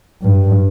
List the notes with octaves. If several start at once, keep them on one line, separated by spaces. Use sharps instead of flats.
G2